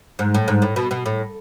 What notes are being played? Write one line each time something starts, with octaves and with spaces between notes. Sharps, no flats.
G#2
A2
G#2
A2
B2
B2
A2